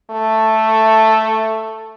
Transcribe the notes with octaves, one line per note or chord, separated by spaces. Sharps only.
A3